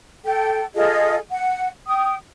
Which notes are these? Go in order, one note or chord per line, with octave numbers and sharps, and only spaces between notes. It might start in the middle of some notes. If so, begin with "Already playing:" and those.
A4 G5
F4 G#4 A4 D#5
F#5
G5 D#6